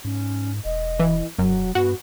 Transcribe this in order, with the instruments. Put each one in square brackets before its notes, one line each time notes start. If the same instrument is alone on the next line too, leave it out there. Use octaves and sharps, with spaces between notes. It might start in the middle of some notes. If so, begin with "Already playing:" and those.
[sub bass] G#2 [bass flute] C#4
[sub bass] E1 [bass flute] D#5
[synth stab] E3
[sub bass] E1 [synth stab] F#2 [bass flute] F#3
[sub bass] G2 [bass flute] B3 [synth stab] F#4